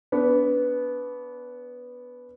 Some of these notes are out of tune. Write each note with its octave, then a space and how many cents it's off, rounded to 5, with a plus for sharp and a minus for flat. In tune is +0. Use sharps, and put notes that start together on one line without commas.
B3 +0 D4 -30